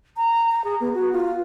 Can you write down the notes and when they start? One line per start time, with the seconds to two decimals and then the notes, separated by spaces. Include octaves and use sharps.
0.17 A#5
0.52 A#5
0.64 G#4
0.80 B3
0.94 F#4
1.13 F4